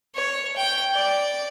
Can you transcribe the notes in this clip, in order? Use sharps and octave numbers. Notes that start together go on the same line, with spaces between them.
C#5
G5
D5